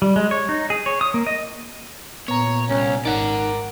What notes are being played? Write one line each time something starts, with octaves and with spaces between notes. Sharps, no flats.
G3
G#3
C#5
D#4
G#4
C#5
D#6
A#3
D#5
A#2 B3 C#5 A#5
C2 C#4
G#1 D#4 A#4 D5 F#5